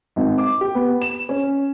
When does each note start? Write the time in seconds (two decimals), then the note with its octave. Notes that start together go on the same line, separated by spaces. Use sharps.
0.16 G#1
0.38 D6
0.61 G4
0.75 B3
1.02 E7
1.29 C#4